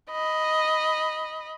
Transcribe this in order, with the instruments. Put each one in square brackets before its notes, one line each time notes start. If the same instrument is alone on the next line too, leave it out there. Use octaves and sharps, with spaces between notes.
[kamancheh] D#5 B5